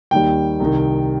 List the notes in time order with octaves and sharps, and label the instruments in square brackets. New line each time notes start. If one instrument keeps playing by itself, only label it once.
[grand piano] D#2 D#3 G3 G5
C2 C3 D#3